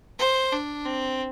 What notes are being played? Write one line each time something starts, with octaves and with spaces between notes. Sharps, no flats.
C5
D4
C4